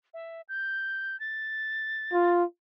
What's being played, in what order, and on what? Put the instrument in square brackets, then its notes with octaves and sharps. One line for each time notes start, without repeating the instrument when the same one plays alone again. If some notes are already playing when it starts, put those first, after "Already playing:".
[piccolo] E5
G6
A6
[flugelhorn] F4